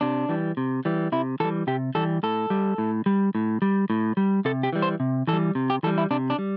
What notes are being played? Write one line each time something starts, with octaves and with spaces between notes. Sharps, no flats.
C3 D4
E3 G3
C3
E3 G3
C3 E4
E3 G3 A4
C3 G4
E3 G3 A4
A2 A4
G3
A2
G3
A2
G3
A2
G3
C3 A4
G4
E3 G3
C5
C3
E3 A4
G3
C3
G4
E3 G3 A4
E4
C3 D4
D4
G3